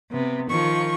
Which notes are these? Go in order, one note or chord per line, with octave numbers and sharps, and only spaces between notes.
C3 B3
D#3 F3 C#6